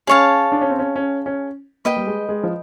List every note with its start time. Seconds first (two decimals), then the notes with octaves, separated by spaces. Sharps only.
0.07 C#4 G#4 C#5 F5 A5
0.52 D4
0.61 C#4
0.70 C4
0.79 C#4
0.96 C#4
1.26 C#4
1.85 A#3 B4 D#5 G5
1.97 G3
2.07 G#3
2.29 G#3
2.43 F3